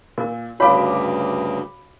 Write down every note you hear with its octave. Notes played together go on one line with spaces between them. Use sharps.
A#2 A#4
D2 G2 C#3 F#4 C#5 F5 B5 D6